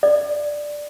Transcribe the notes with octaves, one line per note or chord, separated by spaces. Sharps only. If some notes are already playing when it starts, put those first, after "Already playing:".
D5